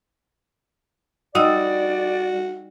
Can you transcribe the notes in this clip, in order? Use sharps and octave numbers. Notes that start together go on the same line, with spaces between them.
G3 D#4 F#4 D5 D#5 E6